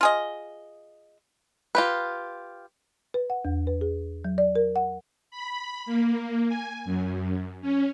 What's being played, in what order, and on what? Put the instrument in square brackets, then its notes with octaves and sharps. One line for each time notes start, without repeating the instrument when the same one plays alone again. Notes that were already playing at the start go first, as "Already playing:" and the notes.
[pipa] F4 G#4 D#5
[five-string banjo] F4 G4 B4
[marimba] B4
F#5
E2
B4
G#4
F#3
D5
A#4
F#5
[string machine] B5
A#3
G#5
F#2
C#4